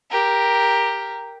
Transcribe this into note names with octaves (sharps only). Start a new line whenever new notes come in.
G4 A#4